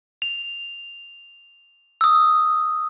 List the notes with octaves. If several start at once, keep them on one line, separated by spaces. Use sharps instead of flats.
F7
D#6 E6